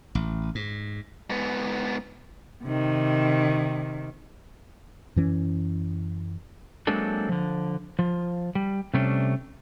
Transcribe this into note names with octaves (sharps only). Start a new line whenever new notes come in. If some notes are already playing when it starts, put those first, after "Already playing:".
A1
G#2
G#2 B3
C3 D#3
F#2 E3 C#4
F#3 G#3 A#3 C4 D4 A4
D3 F3
F3 F4
G3
C3 G3 A3 C#4 D4